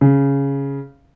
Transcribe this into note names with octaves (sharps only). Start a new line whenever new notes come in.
C#3